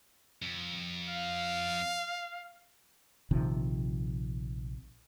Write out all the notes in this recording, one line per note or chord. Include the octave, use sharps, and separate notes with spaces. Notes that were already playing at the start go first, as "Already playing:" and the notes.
F2
F5
A#1 C3 D#3 F3